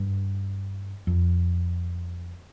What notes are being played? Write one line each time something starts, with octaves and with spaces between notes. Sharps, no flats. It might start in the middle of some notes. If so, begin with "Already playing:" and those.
Already playing: G2
F2